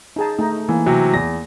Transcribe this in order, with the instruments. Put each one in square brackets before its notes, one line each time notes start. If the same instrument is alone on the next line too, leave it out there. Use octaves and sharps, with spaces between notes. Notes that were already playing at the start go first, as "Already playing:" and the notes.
[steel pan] D#4 G#4 A5
A3 D#4
[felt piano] E3 [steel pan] A#3
[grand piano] C3 F#3
[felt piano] E2 [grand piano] A#6